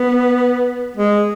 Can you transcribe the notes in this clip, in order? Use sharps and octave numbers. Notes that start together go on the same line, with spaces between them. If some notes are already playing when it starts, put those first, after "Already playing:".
Already playing: B3
G#3